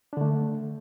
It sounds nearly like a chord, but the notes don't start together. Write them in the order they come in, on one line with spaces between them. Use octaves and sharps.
D4 D3 A3